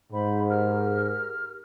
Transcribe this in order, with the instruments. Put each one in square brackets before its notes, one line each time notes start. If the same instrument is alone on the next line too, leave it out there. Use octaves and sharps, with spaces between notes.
[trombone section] G#2 [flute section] C5 E5 B5
[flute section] G4 A#4 F6